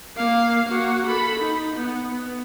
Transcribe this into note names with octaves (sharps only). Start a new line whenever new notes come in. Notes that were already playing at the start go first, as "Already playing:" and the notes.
A#3 F5
A#3 F#4
A4 B5
D#4
B3
B3